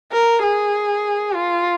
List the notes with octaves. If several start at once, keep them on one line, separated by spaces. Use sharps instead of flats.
A#4
G#4
F4